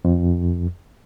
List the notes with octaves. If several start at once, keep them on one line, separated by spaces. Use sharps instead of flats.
F2